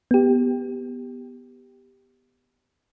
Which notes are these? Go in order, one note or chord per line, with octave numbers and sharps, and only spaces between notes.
B3 G4